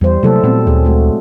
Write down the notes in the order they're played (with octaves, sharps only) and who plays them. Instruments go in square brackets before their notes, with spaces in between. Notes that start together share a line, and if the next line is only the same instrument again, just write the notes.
[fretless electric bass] E2 [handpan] G3 C5
[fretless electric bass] C3 F#3 A#3 [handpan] A3 E4 A4
[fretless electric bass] A#2 B3 [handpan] F#3 A3 C4
[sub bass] D2 [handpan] A3 G#4
[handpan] G#3 A3 F#4